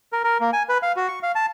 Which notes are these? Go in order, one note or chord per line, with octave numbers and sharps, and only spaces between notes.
A#4
A#4
A#3
G#5
B4
F5
F#4
C#6
F5
A5